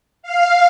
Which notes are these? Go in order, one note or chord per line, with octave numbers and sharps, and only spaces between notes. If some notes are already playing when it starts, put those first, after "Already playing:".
F5